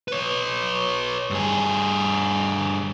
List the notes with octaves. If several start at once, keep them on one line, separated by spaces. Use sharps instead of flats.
B4 C#5
G2 G#4